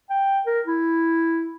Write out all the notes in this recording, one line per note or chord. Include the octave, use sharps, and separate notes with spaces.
G5
A#4
E4